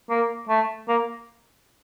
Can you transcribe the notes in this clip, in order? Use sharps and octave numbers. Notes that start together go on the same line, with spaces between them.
A#3
A3
A#3